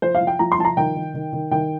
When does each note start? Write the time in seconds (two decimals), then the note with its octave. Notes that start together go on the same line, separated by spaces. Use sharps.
0.02 F3 C5
0.15 F5
0.21 F3
0.27 G5
0.39 F3 A#5
0.52 C6
0.59 F3 A5
0.65 A#5
0.77 D#3 G5
0.96 D#3
1.14 D#3
1.33 D#3
1.51 D#3 G5